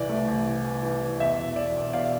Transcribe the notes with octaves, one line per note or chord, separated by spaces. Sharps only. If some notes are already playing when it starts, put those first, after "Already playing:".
Already playing: C2 E3 D5
A3
C2
E3
E3
E3
E3
E2 E5
E1
E1 D5
E2
E1 D5 F5